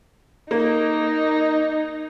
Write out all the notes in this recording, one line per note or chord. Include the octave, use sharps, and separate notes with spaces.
A#3 D#4